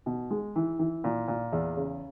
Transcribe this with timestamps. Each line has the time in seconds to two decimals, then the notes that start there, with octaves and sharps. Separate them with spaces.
0.06 B2
0.31 G#3
0.56 E3
0.79 E3
1.04 A#2
1.28 A#2
1.52 E2
1.77 C#3